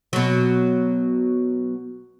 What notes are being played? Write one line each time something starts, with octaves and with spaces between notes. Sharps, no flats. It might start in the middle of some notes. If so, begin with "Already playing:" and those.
B2 F#3